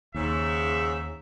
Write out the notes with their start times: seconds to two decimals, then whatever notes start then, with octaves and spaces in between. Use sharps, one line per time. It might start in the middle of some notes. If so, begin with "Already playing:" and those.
0.15 D#2 G#2 C#3 E5